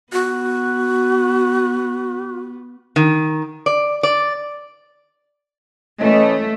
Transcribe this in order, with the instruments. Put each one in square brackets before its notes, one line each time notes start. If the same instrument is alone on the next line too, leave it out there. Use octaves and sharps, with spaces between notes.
[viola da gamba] B3 [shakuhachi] F#4
[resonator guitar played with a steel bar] D#3
D5
D5
[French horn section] E3 C#4 D#5 [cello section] A3